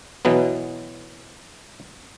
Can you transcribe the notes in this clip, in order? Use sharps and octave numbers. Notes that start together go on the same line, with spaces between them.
B2 E3 F#3 B3